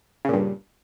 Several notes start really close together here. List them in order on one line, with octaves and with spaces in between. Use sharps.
C#3 A#2 G2